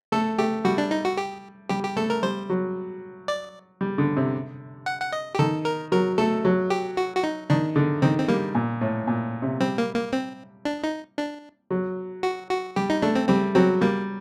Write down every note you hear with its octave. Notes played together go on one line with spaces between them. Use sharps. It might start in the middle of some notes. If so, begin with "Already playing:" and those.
A3 A4
A3 G4
G3 F#4
D4
D#4
F#4
G4
G3 G4
G4
A3 A4
A#4
G3 C5
F#3
D5
G3
D3
C3
F#5
F#5
D#5
G4
D#3 A4
A#4
F#3 A#4
A3 A4
F#3
G4
F#4
F#4
D#4
D#3 D4
D3
D#3 C4
C4
G3 A#3
A#2
A2
A#2
C3
G3 C4
A#3
A#3
C4
D4
D#4
D4
F#3
F#4
F#4
G3 G4
D#4
A3 D4
C4
G3 C4
F#3 C4
G3 A#3